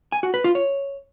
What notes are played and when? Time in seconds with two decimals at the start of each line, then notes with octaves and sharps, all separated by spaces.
0.12 G#5
0.23 F#4
0.34 B4
0.44 F4
0.55 C#5